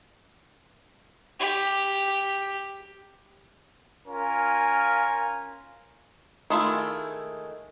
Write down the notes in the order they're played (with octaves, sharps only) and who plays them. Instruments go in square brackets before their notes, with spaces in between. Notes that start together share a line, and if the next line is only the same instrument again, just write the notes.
[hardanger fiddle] G4
[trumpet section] C#4 F4 A#4 F5 G#5
[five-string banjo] D#3 G#3 A3 E4 F4